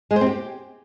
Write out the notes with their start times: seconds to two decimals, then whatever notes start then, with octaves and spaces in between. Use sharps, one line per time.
0.11 G#3
0.16 C5
0.21 C4
0.26 G4